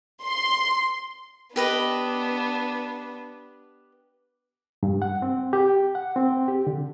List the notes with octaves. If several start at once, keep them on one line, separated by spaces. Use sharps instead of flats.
C6
B3 D4 G4 B4 D#5
G2
F#5
C4
G4
F#5
C4
G4
D3